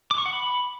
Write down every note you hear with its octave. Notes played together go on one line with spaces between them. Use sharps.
D6
C#6
F#5
B5